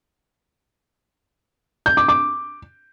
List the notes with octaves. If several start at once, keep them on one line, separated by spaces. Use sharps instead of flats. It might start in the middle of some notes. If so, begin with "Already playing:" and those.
G6
D6
D6